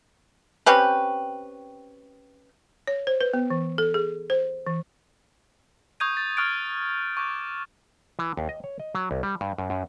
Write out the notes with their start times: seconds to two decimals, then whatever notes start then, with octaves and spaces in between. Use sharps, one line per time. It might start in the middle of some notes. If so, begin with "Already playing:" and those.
0.66 C4 C#4 G4 B4
2.87 C#5
3.07 C5
3.21 B4
3.34 B3
3.50 E3
3.78 A4
3.94 G#4
4.30 C5
4.67 E3
6.00 C#6 D#6 G6 G#6 D#7
6.17 A6
6.37 C#6 D#6 F6 F#6 A6 D7
7.17 C#6 D6 G6
8.19 E3
8.37 D#2
8.49 D#5
8.64 C#5
8.79 D#5
8.95 F#3
9.11 C2
9.23 G3
9.41 G2
9.58 F#2
9.70 F#2